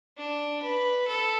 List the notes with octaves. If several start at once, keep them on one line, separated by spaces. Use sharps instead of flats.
D4
B4
A4